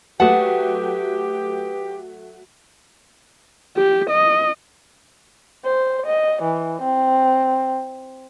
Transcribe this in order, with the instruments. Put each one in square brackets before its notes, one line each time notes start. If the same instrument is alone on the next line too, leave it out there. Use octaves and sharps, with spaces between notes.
[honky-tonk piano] F#3 A3 F#4 [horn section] G4 [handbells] B4 D#6 [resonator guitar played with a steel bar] F#5 A5
[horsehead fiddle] G4
D#5
[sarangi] C5
D#5
E3
C4